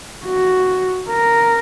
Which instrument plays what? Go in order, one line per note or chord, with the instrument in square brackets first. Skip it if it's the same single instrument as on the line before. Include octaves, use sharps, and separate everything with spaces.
[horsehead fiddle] F#4
A#4